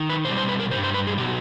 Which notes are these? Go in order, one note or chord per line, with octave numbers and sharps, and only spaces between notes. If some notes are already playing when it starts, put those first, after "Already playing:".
Already playing: D#3
B4
B2 G3 C5
C5
B4
A#4
G2 D#3 G3 C5
C5
B4
G#4
B2 F#3 G4